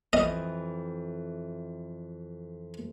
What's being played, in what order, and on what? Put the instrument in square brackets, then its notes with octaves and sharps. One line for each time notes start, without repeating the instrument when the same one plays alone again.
[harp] F2 E3 [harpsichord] D#5